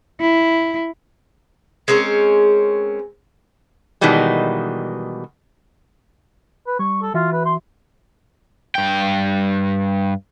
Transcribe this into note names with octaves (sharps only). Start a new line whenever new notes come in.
E4
G#3 C4 C#4 A#4
B2 D#3 E3 G3 G#3
B4
G3 C#6
A4
E3 F4 F#4 E5
B4
C6
G2 G5